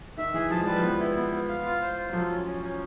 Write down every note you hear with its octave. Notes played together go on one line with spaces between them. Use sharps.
D#3 E5
E3 G#4
F3 A5
G#3
G3 B4
F3
E3 B3
E4
B3
B3
F5
F4
C5
F4
F#3
F3 A4
C#4
C#4
C#4